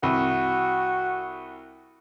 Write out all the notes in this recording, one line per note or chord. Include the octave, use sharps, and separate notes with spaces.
C2 F#4